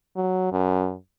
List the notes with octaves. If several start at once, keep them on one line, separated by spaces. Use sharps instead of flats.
F#3
F#2